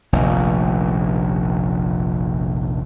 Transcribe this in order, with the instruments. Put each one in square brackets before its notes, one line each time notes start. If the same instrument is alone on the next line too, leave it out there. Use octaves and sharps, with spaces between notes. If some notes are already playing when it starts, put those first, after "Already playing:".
[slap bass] F1 A#1 D#2